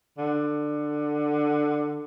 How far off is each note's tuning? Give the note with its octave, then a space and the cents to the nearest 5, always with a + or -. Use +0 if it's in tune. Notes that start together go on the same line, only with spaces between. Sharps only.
D3 +15